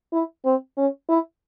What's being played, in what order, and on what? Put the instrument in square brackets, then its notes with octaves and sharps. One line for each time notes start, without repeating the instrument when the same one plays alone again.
[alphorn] E4
C4
C#4
E4